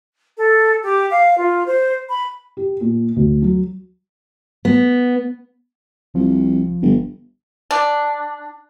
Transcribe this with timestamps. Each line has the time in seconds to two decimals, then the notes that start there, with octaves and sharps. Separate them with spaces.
0.37 A4
0.82 G4
1.10 F5
1.36 F4
1.66 C5
2.09 B5
2.57 G4
2.81 A#2
3.16 D2
3.42 F#3
4.65 B3
6.15 C2 F3
6.82 G1
7.71 D4